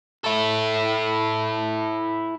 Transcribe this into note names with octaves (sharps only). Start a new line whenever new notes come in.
E4 A4